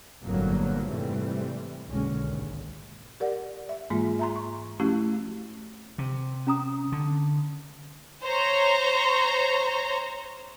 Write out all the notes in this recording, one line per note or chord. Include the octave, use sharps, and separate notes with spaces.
G1 F2 A#2 F#3 A#3 B3
G#2 C3 E3 G3 A3 C4
F#1 B1 B2 D3 G#3 C#4
G#1 D#2
G4 A#4 D5 F#5
E5
G#2 E3 G#3 A#3 F4
E5 A#5 C6
C#6
F3 A3 C#4 E4 F#4 G4
C3
C#4 A#5 D#6
D3
C5 C#5 A#5